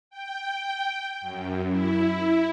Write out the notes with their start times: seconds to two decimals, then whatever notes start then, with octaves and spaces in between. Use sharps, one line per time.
0.10 G5
1.21 F#2
1.68 E4